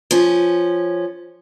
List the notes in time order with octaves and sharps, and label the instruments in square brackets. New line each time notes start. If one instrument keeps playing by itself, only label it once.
[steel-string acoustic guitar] F3 C#4